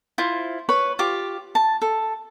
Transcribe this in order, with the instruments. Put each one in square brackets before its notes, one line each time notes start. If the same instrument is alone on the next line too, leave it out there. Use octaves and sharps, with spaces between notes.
[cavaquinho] E4 F4 C5
B4 C#5 B5
F4 G4 D6
A5
A4